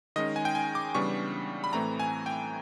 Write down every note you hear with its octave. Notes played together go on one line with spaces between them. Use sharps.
D#3 G#3 C#4 D#5
G#5
G5
G#5
D6
C#3 E3 G3 B3 D4 C#6
B5
A2 E3 A3 C4 A#5
G#5
G5